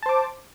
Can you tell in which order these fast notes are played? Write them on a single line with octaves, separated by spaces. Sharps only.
A5 C5 D6